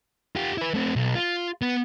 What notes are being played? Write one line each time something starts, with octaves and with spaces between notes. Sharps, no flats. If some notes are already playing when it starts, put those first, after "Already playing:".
F4 G4
E4 B4
A3 C4
B1
F4
B3